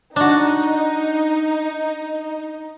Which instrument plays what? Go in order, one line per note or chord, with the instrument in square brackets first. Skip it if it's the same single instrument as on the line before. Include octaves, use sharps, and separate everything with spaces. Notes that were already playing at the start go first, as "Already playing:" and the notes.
[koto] D4 F#4 [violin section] D#4